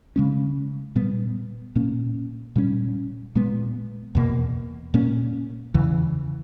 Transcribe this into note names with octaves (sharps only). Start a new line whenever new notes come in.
C#3 G#3 C#4
A#2 G3 B3
A#2 A#3 C#4
A#2 G3 C#4
A#2 G#3 B3
E2 B2 A#3
A#2 A#3 C#4
E2 C#3 E3